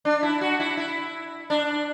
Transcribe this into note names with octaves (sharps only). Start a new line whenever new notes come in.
D4
E4
F#4
E4
E4
D4